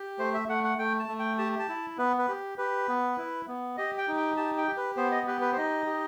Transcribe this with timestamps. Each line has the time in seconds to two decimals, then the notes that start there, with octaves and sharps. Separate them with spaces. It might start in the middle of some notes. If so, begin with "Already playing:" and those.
Already playing: G4
0.19 A3 C5
0.34 E5
0.48 A3 F#5
0.64 F#5
0.78 A3 G5
0.99 A5
1.08 A3
1.19 G5
1.38 G4 A5
1.59 A5
1.69 E4
1.98 B3 B4
2.18 B4
2.28 G4
2.58 G4 B4
2.88 B3
3.17 E4
3.48 B3
3.77 G4 D#5
3.98 G5
4.08 D#4
4.17 G5
4.37 G4 A5
4.58 G5
4.68 G4
4.77 B4
4.97 B3 C5
5.12 D#5
5.27 G4 B4
5.41 B4
5.53 C5
5.57 D#4 D#5
5.86 G4